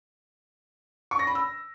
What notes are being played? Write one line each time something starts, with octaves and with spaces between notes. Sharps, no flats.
C#6
A#6
B5
E6